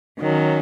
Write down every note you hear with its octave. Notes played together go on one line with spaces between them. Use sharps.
D#3 F#3 C#4